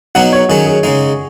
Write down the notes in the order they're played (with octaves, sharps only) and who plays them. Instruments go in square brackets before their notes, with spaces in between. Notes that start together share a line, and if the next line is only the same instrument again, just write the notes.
[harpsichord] B2 F#3 D#4 F#4 [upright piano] F#5
[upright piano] C#5
[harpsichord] D#3 F#3 C#4 [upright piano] G#4
[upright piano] G#4
[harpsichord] C#3 G#3 D#4